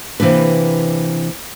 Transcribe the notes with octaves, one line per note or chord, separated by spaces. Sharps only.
C3 E3 A#3 D4 B4